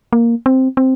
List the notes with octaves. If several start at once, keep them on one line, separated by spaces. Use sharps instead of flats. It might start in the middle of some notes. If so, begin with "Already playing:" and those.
A#3
C4
C4